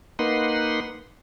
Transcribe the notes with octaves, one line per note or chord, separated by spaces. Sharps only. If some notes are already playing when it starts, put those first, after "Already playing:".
A#3 D#4 B4 F#5 C6